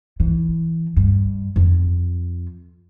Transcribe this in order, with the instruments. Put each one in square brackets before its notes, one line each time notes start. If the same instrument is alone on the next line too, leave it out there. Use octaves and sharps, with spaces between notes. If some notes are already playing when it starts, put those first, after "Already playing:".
[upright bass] E3
G2
F2